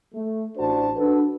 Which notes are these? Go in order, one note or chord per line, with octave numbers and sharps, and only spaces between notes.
A3
A1 D4 F#4 C5 A5
D4 F#4 A4 B4